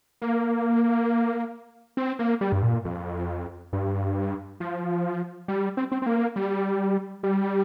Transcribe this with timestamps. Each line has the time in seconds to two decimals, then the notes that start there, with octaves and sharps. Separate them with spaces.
0.22 A#3
1.97 C4
2.19 A#3
2.41 G3
2.52 G2
2.62 A#2
2.85 F2
3.73 G2
4.60 F3
5.48 G3
5.77 C4
5.92 C4
6.02 C4
6.06 A#3
6.36 G3
7.23 G3